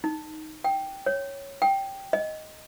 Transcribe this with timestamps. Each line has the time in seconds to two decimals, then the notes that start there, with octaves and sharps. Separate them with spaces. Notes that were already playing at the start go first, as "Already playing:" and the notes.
0.04 D#4
0.64 G5
1.06 C#5
1.62 G5
2.13 D#5